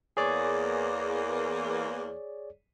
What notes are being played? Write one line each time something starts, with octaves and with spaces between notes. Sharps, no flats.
E2 A#3 G#4 C#5 D5